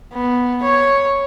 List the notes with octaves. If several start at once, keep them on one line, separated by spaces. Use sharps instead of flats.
B3
C#5